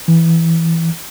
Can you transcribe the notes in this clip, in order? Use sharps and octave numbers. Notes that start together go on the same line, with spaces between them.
E3